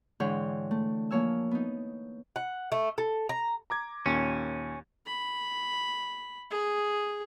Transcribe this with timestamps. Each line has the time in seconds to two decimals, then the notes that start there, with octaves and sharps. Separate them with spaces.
0.20 G#2 D3 E3 G#4 C#5 G5
0.71 A3
1.11 F3 A#3 C#5 G#5 E6
1.51 B3 D#4
2.36 F#5
2.72 A3
2.98 A4
3.29 A#5
3.70 A#5 D6 G#6
4.06 D#2 A#2 C#4
5.06 B5
6.51 G#4